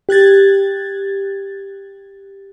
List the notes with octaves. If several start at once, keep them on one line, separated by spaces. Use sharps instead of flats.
G4 F#6 G#6 A6